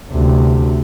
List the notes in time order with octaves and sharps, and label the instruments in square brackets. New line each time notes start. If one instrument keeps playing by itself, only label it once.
[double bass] D2 C3